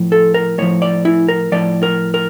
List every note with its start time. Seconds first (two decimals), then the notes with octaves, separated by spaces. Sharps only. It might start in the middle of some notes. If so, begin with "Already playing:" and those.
Already playing: A2 F3
0.12 A4
0.34 A#4
0.58 A2 F3 C#5
0.82 D5
1.05 E4
1.28 A#4
1.52 A2 F3 D5
1.83 A#4
2.14 A#4